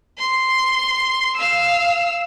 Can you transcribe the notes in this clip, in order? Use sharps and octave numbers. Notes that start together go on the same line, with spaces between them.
C6
F5 E6